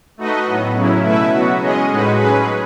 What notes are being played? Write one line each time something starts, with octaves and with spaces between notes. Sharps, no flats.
A3 D#4 F#4 B4 D#5
A2 F#3 B3
C#3 F#3 C#4 E4
B2 A3 E4 B4 E5
F#3 B3 F#4
G#3 C#4 G#4 D#5
A2 G#3 D#4 F#4 B4
F#3 C#4 G#4 B4